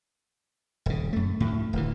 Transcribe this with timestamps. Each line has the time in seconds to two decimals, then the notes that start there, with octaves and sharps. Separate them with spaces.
0.86 D#1 C#3
1.13 F#2 A3
1.40 D2 A2
1.73 D1 D2 E3